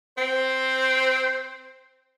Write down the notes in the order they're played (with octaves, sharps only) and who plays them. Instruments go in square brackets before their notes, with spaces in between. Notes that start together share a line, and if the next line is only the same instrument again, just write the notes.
[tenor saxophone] C4 [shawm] C5